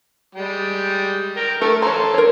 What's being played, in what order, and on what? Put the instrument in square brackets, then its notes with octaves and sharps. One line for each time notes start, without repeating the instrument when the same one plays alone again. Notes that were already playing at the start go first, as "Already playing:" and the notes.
[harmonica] G3 G#3 G5
A#4 G5
[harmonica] A3 [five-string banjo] A4 A#4
[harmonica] A4 C6 [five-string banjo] C#5 A#5
[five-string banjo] A#4 C#5